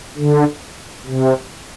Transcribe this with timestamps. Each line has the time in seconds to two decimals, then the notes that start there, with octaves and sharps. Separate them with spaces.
0.18 D3
1.07 C3